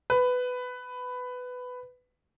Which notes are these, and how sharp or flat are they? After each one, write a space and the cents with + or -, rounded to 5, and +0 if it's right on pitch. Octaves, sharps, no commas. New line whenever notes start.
B4 +15